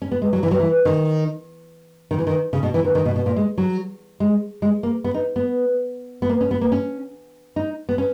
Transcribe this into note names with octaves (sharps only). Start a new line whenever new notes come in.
C#4
B3
G#3
F#3
E3
F#3
E3
D#3
D#3
E3
D#3
C#3
B2
E3
D#3
D#3
B2
B2
A#2
G#3
F#3
G#3
G#3
A#3
B3
D#4
B3
B3
A#3
C#4
B3
A#3
C#4
D#4
B3
C#4